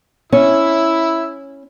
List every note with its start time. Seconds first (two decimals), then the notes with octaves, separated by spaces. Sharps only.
0.32 C#4 E4 E6